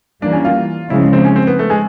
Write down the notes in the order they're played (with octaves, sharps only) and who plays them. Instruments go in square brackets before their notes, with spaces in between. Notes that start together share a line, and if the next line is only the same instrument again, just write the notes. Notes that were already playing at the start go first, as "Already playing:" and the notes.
[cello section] E3 G3 A#3 [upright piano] D4
[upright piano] C#4
F4
[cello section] C#3 F3 G#3 [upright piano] E4
[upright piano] C4
C#4
C4
B3
A3
G#3